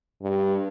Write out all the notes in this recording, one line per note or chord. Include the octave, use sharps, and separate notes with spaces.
G2